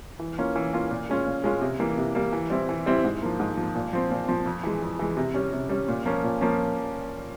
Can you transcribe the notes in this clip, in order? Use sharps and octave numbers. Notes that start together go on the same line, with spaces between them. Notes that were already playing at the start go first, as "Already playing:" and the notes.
E3
A#3 C#4 F4
E3
A#3 C#4 F4
A#2
G#3 C#4 F4
A#2
G#3 C#4 F4
C3
E3 G3 A#3
C3
E3 G3 A#3
E3
G3 C4 E4
E3
G3 C4 E4
G#2
F3 A#3
G#2
F3 A#3
A#2
F3 C4
A#2
F3 C4
F2
E3 G#3
F2
E3 G#3
C3
G3 C#4
C3
G3 C#4
A#2
F3 A#3 C#4
A#2
F3 A#3 C#4